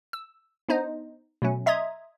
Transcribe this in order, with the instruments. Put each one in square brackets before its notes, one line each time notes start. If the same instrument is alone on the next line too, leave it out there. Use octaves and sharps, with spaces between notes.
[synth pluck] E6
B3 D4 D#4 C5 D#5
B2 F#3 A3 C#4
D#5 E5 A#5 C6 D#6 G#6